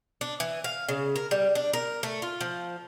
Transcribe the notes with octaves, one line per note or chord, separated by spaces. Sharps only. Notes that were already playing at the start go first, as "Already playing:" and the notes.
D4
E3
F5
C#3
A#4
G3
D4
A#4
A3
F4
F3